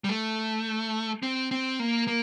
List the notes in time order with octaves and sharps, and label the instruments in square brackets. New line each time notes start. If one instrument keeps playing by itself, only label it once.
[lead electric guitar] G3
A3
C4
C4
A#3
A#3